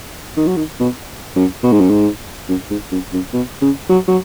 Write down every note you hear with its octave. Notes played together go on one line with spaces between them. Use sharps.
D#3
F#3
D#3
B2
F#2
B2
G#2
F#2
G#2
F#2
G#2
F#2
F#2
B2
C#3
F#3
F#3